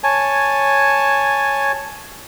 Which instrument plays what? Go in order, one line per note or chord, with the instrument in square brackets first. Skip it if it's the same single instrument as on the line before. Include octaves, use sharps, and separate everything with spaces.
[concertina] C#5 G#5 A5